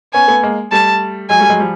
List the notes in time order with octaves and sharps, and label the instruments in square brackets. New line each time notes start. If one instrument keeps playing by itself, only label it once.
[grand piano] B3 C#4 [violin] G#5
[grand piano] A3 B3
G#3 A#3
[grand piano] G3 A3 [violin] A5
[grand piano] F#3 G#3 [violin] G#5
[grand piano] G3 A3
F#3 G#3
F3 G3